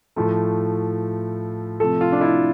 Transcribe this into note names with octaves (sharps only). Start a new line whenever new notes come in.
A2 F3 A3
C3 F3 A3 A4
F4
D4
E4